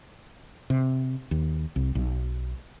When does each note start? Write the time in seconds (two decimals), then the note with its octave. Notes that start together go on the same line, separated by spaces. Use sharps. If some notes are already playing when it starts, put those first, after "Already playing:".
0.70 C3
1.31 D#2
1.76 C2
1.95 B1